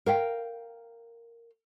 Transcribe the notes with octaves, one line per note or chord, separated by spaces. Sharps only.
A#4 F5 G5